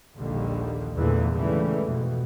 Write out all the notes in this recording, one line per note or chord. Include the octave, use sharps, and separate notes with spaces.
A#1 D#2 D3 D#3 G3
E2 A#2 D3 E3 A3
G#2 C#3 E3 G3 A3
F2 B2